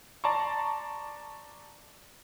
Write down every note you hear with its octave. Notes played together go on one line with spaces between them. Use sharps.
D5 A5 A#5 C6 C#6